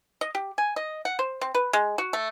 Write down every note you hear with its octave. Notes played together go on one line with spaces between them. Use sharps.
D#5
G4
G#5
D#5
F#5
C5
C4
B4
G#3
F#4
A3